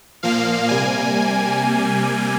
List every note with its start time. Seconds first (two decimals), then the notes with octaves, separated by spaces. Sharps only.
0.23 A#2 F3 A#3 F5
0.69 C3 G3 A#3 G#5